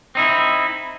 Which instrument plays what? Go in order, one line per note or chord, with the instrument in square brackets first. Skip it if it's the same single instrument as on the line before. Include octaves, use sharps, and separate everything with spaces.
[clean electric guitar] C4 D#4 E4